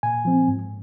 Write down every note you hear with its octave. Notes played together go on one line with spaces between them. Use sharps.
A#2 G#5
F3 C4
G#2